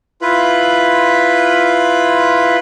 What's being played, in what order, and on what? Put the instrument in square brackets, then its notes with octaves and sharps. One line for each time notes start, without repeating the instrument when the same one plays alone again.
[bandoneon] E4 F4 B4 B5